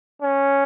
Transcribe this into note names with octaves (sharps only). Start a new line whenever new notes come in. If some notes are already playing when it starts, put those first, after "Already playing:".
C#4